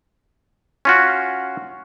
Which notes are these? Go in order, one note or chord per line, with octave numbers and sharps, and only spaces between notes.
C#4 F4 F#4